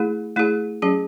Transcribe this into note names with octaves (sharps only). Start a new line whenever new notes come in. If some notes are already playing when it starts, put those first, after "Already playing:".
Already playing: A3 E4 G#4
A3 E4 G#4
F#3 C#4 G#4